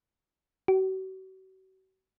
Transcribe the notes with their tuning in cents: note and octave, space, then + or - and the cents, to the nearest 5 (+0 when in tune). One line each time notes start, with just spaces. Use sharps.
F#4 +40